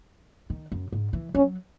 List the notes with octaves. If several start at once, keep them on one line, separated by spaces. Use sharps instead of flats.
D#3
F#2
G#2
E3
F#3 C#4